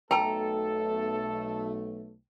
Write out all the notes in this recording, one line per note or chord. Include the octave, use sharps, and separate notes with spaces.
B1 A3 A4 G5 A5 A#5